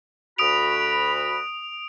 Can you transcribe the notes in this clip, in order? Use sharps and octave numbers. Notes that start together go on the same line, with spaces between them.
D2 F#4 B5 D#6 D7 F7